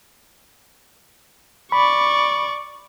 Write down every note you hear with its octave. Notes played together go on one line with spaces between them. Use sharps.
D5 B5 C#6